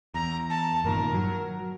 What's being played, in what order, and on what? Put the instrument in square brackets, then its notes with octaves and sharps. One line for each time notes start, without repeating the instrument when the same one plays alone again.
[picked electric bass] E2 [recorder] A#5
[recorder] A5
[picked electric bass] G2 A#2 D#3 [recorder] A#4
[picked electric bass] F#3